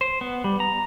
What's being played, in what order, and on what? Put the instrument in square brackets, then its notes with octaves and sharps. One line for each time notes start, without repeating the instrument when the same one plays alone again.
[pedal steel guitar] C5
B3
G3
A#5